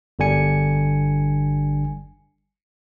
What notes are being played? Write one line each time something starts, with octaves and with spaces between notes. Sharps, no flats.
G1 D3 G3 D4 G#5 C#7